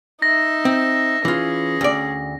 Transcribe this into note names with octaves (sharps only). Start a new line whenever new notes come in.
D#4 E5 A#6
C4
E3 C#4 F4 G#4
D2 D5